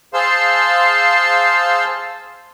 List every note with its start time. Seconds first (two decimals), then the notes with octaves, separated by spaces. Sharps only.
0.14 G#4 C5 F5 A5 C6 E6